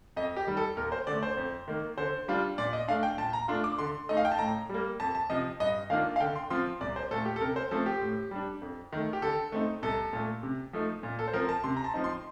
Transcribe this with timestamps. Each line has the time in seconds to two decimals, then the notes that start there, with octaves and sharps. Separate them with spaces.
0.16 F2 D#5
0.36 G4
0.47 D#3 G3
0.57 A4
0.77 D#2 A#4
0.92 C5
1.07 D3 A3 D5
1.23 C5
1.37 F2
1.68 D#3 A#3
1.98 D3 C5
2.28 G3 D4 F4
2.58 A#2 D5
2.73 D#5
2.88 A3 D4 F5
3.03 G5
3.18 A#2 A5
3.33 A#5
3.48 A3 D4 F4 C6
3.64 D6
3.78 D3 C6
4.09 A3 D#4 D#5
4.17 F5
4.25 G5
4.32 A5
4.39 A2 A#5
4.69 G3 A#3
5.00 F2 A5
5.15 A5
5.30 C3 F3 D#5
5.60 G2 D#5
5.90 D#3 A#3 D4 F4 F5
6.16 F5
6.20 D3 G5
6.36 C6
6.50 F3 C4 F4 C6
6.81 C2 D5
6.96 C5
7.11 A#2 A3 A4
7.26 G4
7.36 A4
7.41 C3 A#4
7.56 C5
7.71 F3 A3 C4 A4
7.86 G4
8.01 A2
8.31 G3 D4
8.62 F2
8.92 D#3 A3
9.13 G4
9.22 D3 A4
9.52 A3 C4 D#4
9.83 C2 A4
10.13 A#2 A3
10.43 C3
10.73 F3 A3 D#4
11.03 A#2
11.19 A4
11.28 C5
11.33 F3 C4 A#4
11.49 A5
11.64 C3 C6
11.77 A#5
11.84 A5
11.94 F3 C4 D#4
12.04 C6